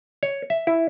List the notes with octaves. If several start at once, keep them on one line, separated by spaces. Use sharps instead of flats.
C#5
E5
E4